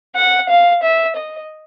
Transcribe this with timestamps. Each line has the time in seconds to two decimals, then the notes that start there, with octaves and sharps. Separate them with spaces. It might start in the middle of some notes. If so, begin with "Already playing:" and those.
0.16 F#5
0.49 F5
0.82 E5
1.16 D#5